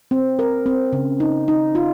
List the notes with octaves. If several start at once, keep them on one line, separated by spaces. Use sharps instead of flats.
C4
A#4
C4
C#3
D#4
D#4
F4